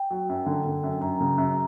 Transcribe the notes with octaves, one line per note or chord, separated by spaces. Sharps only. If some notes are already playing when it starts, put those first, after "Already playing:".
Already playing: G5
F#3
F#2
D3
D3
F#2
F#2 A#5
C#3
F#2